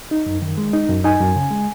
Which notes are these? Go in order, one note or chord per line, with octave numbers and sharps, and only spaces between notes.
D#4
F#2
D#3
G#3
D#4
F#2
D#4 G#5
F#2
C#3
G#3